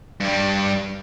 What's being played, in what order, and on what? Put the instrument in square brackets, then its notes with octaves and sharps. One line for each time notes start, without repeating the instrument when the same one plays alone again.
[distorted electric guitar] G2 G3